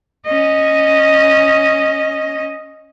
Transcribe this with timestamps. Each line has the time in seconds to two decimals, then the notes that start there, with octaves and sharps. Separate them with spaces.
0.26 C#4 D#5